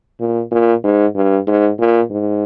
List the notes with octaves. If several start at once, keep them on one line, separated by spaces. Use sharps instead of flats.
A#2
A#2
G#2
G2
G#2
A#2
G#2